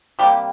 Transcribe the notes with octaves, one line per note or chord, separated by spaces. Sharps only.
C3 G3 A#3 G4